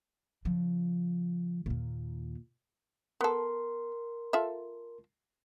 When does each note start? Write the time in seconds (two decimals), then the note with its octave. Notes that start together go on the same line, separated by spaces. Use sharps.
0.45 C#3 F3
1.66 D#2 A#2
3.21 B3 A4 A#4 C6
4.33 F4 A4 E5